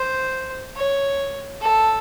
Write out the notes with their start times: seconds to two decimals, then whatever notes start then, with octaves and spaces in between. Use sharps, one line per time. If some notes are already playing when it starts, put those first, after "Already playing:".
Already playing: C5
0.76 C#5
1.61 A4